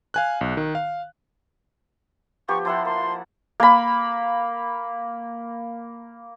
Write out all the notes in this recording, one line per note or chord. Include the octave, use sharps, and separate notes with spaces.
F5 G#5 F#6
B1
D#3
F5
F3 B3 G4 C#6
F3 E4 F#5 C6
A#3 C6
A#3 B5